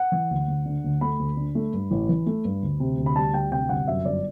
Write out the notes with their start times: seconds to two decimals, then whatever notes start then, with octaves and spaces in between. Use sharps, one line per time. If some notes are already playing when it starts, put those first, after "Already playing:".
Already playing: F#5
0.12 E3
0.31 D2
0.48 D2
0.66 D3
0.84 D2
1.01 A3 B5
1.19 D2
1.37 D3
1.55 A3
1.73 G2
1.91 A1
2.09 E3
2.26 A3
2.45 G2
2.62 D2
2.80 C3
2.98 D2
3.06 B5
3.16 G3 A5
3.34 D2 G5
3.52 C3 G5
3.69 G1 F#5
3.88 F#2 E5
4.05 G1 D5